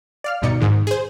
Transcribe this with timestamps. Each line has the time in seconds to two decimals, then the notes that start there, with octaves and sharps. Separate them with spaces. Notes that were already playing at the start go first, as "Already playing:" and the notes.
0.24 D5 F5 F6
0.42 D2 G2 B2 D#4 D5 C#7
0.60 G#2 D#3 G#3
0.87 G#4 C5